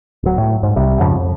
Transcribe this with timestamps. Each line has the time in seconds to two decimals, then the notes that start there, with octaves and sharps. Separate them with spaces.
0.23 D1 F#3
0.38 A2
0.63 G#2
0.76 C2 C3 G3
0.99 F2 G#2 C#3 F3
1.15 F2